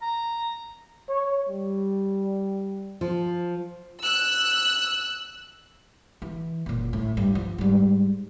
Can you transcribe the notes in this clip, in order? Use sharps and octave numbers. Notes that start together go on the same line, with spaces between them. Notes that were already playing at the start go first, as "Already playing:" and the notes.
A#5
C#5
G3
F3
E6 F#6
E3
F#1 A#2
A2
G2
F3
G#2 G3